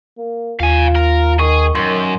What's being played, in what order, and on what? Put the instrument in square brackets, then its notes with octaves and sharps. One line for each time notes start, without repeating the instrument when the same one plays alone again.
[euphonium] A#3
[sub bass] D#2 [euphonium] F4 [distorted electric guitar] F5 G#5
[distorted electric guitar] A#4
[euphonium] D#3 [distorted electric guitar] G#4 [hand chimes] C#6
[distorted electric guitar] F#2 [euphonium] D#3 [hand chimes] C6